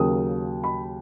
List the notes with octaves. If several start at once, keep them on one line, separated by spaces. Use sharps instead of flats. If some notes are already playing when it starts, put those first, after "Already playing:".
Already playing: D#2 C#3 F#3 A#3 D#6
B5